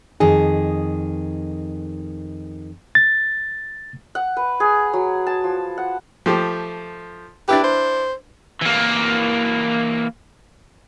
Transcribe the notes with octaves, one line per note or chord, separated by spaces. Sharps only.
F2 D#3 G#4
A6
F#5
B4
G#4
F#3
A5
F3
F#5
F3 A3 G4
D4 E4 G4 B4
C5
E3 A#3